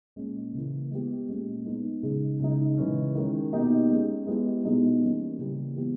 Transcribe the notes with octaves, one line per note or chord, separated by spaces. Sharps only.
A#2 G#3 C#4
C#3 E3 A#3 E4
G#3 B3 G4
A#2 G#3 C#4
G#3 B3 D#4
C#3 G#3 D#4 G#4
C#3 G#3 D#4
C#3 E3 G#3 C#4
D#3 G#3 C#4 G#4
B2 A#3 D#4 G4
G#3 C#4 G#4
G#3 B3 E4 G4
B2 G#3 D#4 G#4
E3 G3 A#3 C#4
C#3 E3 G3 A#3
E3 G#3 B3 G4